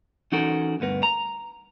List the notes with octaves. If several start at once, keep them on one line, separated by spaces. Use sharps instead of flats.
E3 C#4 D#4 F#4 A4 A#4
D2 G2 B3 A#4
A#5